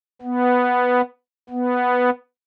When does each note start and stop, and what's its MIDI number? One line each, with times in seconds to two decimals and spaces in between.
0.22 1.01 59
1.50 2.10 59